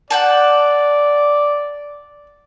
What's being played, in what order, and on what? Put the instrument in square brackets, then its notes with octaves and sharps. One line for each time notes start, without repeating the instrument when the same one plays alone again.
[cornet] D5 [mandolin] F#5 G5 A5